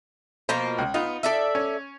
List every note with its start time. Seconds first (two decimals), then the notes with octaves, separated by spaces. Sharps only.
0.49 B2 F3 A#3 C5
0.78 C#2
0.94 B3 D#4 F4
1.23 A4 D5 E5
1.55 C#4